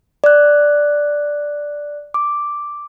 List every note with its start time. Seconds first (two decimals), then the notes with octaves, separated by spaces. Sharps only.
0.24 D5 F#6
2.14 D6